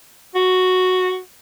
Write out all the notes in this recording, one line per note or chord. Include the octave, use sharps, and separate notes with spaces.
F#4